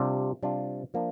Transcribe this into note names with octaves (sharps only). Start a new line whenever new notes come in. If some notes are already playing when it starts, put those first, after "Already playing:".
Already playing: C3 G3 D4 F4
C3 G3 D4 F4
F3 A#3 D4